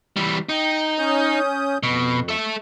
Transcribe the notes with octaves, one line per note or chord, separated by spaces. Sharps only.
E3 G3
D#4 G5
C#4 D#6 G6
F2 B2
A4 E5